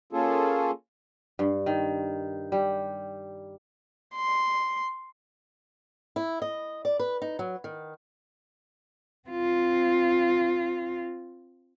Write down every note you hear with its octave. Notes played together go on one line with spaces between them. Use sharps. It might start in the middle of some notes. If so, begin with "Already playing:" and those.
A#3 C#4 F4 G#4 A4
G2
D#3
G3
C6
E4
D#5
D5
B4
D#4
F#3
D#3
C4 F4